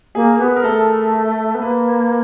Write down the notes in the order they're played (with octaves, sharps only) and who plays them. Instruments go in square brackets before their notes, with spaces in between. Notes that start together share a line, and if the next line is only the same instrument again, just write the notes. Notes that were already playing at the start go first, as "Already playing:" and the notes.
[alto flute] A#3 [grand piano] G#4
[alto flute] B3 [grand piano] G#4
[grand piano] A#4
[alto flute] A3 [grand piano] A4
[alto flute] B3
[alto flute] A#3 [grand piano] B4